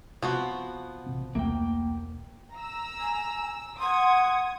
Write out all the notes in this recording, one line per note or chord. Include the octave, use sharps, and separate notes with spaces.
C3 F3 B3 F#4
A1 C3 C4
E1 C2 C3 A3 A#3 G5
A#5 E6
G#5
F#5 C6 D#6 G#6